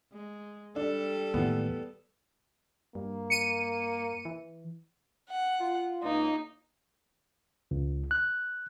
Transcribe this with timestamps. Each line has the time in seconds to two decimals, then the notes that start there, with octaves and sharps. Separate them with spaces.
0.13 G#3
0.76 G3 D4 A4
1.34 D#2 A2 E3 B3
2.95 G2 A#3
3.30 C#7 D#7
4.25 E3
5.29 F#5
5.60 F4
6.04 C#2 A#3 D#4
7.71 C#2
8.11 F#6